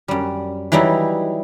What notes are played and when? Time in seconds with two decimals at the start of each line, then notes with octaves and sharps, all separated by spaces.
0.08 F#2 G3
0.72 E3 F#3 G3 D#4 E4